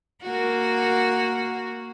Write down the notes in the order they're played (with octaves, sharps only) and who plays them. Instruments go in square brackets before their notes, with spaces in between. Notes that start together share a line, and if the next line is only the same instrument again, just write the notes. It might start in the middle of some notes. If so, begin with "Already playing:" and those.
[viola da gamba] A#3 F#4